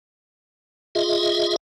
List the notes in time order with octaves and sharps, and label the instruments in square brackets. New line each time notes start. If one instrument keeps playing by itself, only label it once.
[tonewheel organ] F4 G#4 D#5 E5